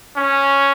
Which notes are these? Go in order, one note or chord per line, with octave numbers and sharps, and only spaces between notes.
C#4